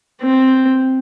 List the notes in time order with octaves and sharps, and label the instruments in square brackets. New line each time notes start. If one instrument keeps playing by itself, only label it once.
[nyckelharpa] C4